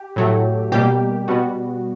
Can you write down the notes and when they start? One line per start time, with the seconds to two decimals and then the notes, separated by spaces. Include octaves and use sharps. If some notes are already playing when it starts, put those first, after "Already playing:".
Already playing: G4
0.16 A2 F#3 A3
0.72 B2 G3 A#3 G4
1.28 B2 G3 B3 F#4